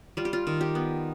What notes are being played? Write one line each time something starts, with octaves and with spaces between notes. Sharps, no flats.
G3 F4
G4
F4
D#3
G4
B3